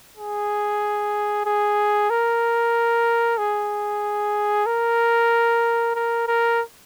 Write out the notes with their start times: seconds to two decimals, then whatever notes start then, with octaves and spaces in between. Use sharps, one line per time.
0.18 G#4
1.46 G#4
2.10 A#4
3.38 G#4
4.66 A#4
5.95 A#4
6.28 A#4